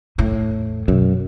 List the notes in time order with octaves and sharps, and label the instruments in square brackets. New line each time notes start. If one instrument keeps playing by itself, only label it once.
[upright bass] E2 A2
[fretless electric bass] F#2 [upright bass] B2